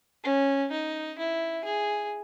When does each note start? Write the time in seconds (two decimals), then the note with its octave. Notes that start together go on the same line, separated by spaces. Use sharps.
0.24 C#4
0.71 D#4
1.18 E4
1.65 G#4